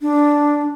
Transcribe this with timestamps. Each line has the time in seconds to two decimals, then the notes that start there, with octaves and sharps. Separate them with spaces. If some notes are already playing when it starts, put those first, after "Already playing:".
0.01 D4